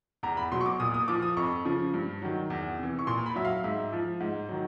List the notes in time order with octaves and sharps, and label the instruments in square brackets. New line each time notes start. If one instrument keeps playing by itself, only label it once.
[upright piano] E2 A#5
B5
B2 F#3 C6
C#6
D6
A#2 D#6
D#6
F3 D6
D#6
F2 C#6
C#3 F3
G2
D#3 F#3
E2
C3 E3
C#6
A#2 C6
B5
F#3 E5
F5
G#2 E5
F3
G#2
D#3 F#3